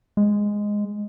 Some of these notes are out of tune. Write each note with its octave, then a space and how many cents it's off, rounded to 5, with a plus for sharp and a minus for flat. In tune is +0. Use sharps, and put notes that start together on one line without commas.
G#3 -5